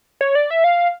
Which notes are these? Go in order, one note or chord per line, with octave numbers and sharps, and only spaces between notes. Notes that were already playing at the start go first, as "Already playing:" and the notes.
C#5
D5
E5
F5